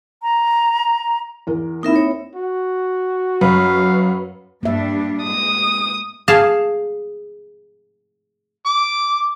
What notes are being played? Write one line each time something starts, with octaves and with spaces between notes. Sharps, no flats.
A#5
E2 A#4
A#3 C4 D#4 E4 A#4 E5
C#5
F#4
F#2 B4 F5
G2 G3 A#3 D4 E5
G#3 D#6
G#4 F5 A5
D6